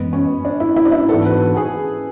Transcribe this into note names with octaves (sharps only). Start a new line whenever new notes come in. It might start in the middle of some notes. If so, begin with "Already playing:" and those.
Already playing: F#2 E3 G#3 B3
C#4
D4
E4
E4
D4
E4
G#2 E3 B3 D4 F#4 A4
B4
G#4